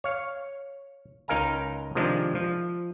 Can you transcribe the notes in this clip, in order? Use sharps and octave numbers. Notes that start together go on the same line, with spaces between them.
C#5 F5
C#2 D#4 A#4 F5 G#5 A#5
C3 D#3 F3 G#3 D4
F3